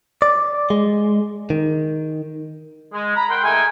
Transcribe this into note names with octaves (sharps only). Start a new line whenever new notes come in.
D5
G#3
D#3
G#3
A#5 B5
A#4 F#5 G5 C6
D#3 A3 G#4 A#4 G5 G#5